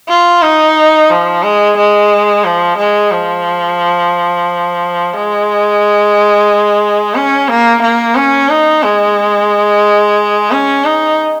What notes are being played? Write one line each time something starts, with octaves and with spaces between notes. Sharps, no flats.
F4
D#4
F3
G#3
G#3
F3
G#3
F3
G#3
C#4
A#3
A#3
C#4
D#4
G#3
C#4
D#4